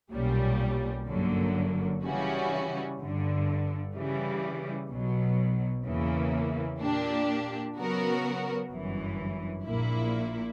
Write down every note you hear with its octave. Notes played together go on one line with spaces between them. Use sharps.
B1 A#2 G3 C#4
G1 F#2 D3 F#3 A#3
C#3 E3 G3 C#4 F#4
G1 G2 D3
C#3 E3 G3
B1 B2 F#3
E2 C#3 E3 A#3
A#2 A#3 D4 G4
C#3 F#3 B3 F#4 A#4
G1 F#2 E3
A#1 A#2 A#3 E4